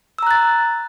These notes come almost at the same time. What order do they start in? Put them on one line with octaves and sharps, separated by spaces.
E6 A#5 F#6 A6